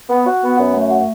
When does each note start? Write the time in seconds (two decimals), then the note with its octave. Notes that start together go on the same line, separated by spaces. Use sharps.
0.10 B3
0.26 F#4
0.42 B3
0.58 F#2
0.75 A3
0.91 F#4